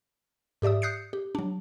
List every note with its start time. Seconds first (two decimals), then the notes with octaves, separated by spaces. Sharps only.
0.62 G#2 G4 D5 E5 D#6
0.82 D#6 F#6 G6 C7 C#7
1.13 G4
1.35 F#3 D4